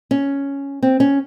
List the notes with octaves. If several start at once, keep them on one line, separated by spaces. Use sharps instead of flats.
C#4
C4
C#4